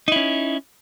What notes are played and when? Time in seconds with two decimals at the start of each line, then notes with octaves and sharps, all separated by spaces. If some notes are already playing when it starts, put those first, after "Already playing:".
0.08 D#4
0.12 E4
0.16 C#4